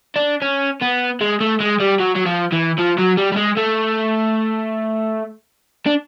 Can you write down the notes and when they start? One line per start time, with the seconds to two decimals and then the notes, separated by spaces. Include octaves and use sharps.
0.16 D4
0.42 C#4
0.81 B3
1.21 G#3
1.41 A3
1.60 G#3
1.80 G3
2.00 F#3
2.15 F#3
2.26 F3
2.52 E3
2.78 F3
2.98 F#3
3.17 G3
3.33 G3
3.37 G#3
3.57 A3
5.86 D4